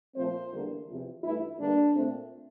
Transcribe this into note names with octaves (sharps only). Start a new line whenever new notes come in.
A#2 F3 A3 C4 C5
E2 D3 G3 A#3
E2 C3 F3
G2 E3 A3 E4
G2 D3 G3 A#3 D4
A#2 A3 C4